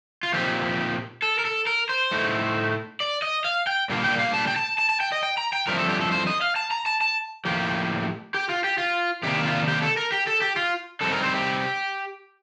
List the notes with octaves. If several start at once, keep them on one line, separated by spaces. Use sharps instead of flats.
F4
A#2 F3 C4 D#4 G4
A4
A#4
A4
A#4
C5
A2 A3 D#4
D5
D#5
F5
G5
A#2 G3 A#3 D4
G5
F5
A5
G5
A5
A5
A5
G5
D#5
G5
A#5
G5
G2 F3 A3 C4 A#4
A4
G4
A4
C5
D#5
F5
A5
A#5
A5
A5
A2 F3 A#3 G4
G4
F4
G4
F4
C3 D#3 A#3 D4 G4
F4
G4
A4
A#4
G4
A4
G4
F4
D3 G3 C4 D#4 A4
A#4
C5
G4